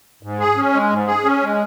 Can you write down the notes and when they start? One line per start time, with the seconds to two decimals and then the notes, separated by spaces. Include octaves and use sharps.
0.23 G#2
0.40 G#4
0.57 C#4
0.73 G#3
0.90 G#2
1.07 G#4
1.24 C#4
1.42 G#3